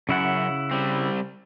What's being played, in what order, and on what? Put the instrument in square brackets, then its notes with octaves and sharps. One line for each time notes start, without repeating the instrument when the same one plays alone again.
[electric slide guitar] F#2 [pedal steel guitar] C#3 E4 F#5
[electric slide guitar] G3 C4